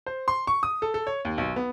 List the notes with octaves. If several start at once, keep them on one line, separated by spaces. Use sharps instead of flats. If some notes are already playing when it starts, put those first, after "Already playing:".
C5
C6
C#6
D#6
A4
A4
C#5
D#2
B1
B3